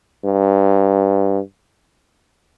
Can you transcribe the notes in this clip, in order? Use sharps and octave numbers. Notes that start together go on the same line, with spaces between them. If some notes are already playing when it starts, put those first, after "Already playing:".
G2